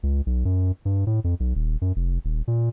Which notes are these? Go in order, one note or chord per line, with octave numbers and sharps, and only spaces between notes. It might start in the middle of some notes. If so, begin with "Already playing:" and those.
C#2
B1
F#2
G2
A2
F2
B1
D#1
F#2
F1
D#1
A#2